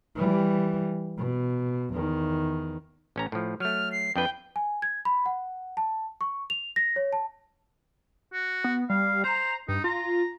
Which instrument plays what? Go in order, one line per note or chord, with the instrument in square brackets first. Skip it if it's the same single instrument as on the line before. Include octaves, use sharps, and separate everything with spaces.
[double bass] E3 G3
B2
E2 D#3
[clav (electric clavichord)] A1 C#4 A#5
A2 F3
[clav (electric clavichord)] F#3 A3 [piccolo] F6
[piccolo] C7
[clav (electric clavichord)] F2 D4 B4 [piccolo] G5
[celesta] G#5
G#6
B5
F#5
A5
C#6
F7
A#6
C#5
A5
[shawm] F#4
[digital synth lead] B3
[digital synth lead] G3 [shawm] F5
[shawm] C5 [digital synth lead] A#5
[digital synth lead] G2 [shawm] D#4
[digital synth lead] F4 [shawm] A#5